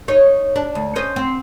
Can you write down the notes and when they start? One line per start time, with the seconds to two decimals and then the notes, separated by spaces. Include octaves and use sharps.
0.08 D#4 C#5
0.56 D4
0.75 D2
0.96 C#4 C5 D#5
1.16 C4